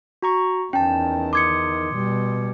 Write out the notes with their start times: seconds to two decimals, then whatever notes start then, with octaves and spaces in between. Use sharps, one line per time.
0.22 F#4 A#5 C#6
0.73 E2 D#3 C#4 G5 A5
1.33 C6 D6 D#6 G#6 C#7
1.94 B2 G3